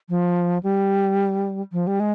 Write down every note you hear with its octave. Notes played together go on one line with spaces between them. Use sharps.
F3
G3
F3
G3
G#3